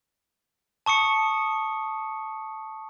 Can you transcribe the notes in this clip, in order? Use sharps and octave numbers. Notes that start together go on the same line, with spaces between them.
A5 C#6 D#6 C#7